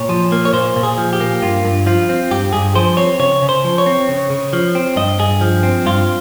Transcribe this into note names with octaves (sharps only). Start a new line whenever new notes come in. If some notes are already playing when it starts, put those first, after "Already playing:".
Already playing: A#2 C#5
F3
A#3
C#5
A#2 C5
A#2
G#4
F3
G4
A#3
G2 F4
G2
F3 F4
C4
G2 G4
G2 G#4
F3 C5
C4 C#5
C#3 C#5
C#3
C5
F3
C#5
C4
C#3
C#3
F3
C4
G2 D#5
G2 G#4
F3
C4
G2 F4